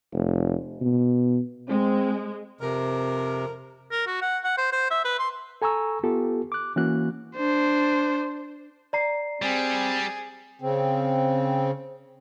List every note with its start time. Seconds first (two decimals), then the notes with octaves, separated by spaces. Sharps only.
0.13 F1
0.81 B2
1.69 G#3 C4
2.61 F2 C3 A#4
3.92 A#4
4.07 F#4
4.22 F#5
4.44 F#5
4.58 C5
4.72 C5
4.91 E5
5.05 B4
5.19 C6
5.62 A4 G#5 A#5 C#6 E6
6.04 B3 F4 G4 A4
6.52 D6 F#6
6.76 E3 A#3 C#4 F#4 F#6
7.36 D4 C5
8.93 D5 A#5 C7
9.42 G3 C4 G#4
10.62 C#3 C4